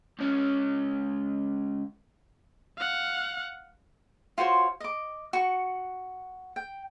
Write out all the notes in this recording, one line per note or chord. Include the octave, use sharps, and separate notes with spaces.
C#2 C#4
F5 F#5
F4 F#4 C5 C#5
D#5 D6
F#4 C#6
G5